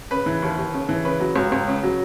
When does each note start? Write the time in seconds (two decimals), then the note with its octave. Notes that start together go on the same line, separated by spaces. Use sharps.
0.11 C#3 B4
0.26 E3
0.42 D#2
0.57 D#2
0.73 C#3
0.89 E3
1.04 C#3 B4
1.20 F#3
1.36 C#2
1.52 C#2
1.67 C#3
1.83 F#3